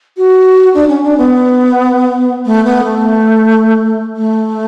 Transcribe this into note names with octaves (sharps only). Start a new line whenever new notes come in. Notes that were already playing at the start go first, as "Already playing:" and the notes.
F#4
D4
C#4
D4
B3
A3
B3
A3
A3